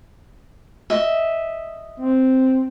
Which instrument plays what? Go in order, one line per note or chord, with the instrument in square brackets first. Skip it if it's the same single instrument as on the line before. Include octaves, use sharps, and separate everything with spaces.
[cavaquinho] D#5 E5
[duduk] C4